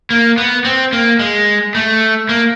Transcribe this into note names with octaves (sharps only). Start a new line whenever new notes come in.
A#3
B3
C4
A#3
G#3
A3
A#3